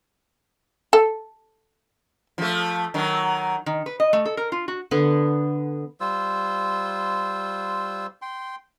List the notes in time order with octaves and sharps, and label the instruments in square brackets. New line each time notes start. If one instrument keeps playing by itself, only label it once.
[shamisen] A4
[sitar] F3 A3
D#3 F#3
[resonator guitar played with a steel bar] D#3
B4
D#5
A3
A4
A#4
F4
F#4
[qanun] D3 B3
[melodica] G3 F4 C5 E6
G5 C6